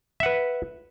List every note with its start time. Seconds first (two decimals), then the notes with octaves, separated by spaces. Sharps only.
0.20 E5
0.23 F#5
0.26 B4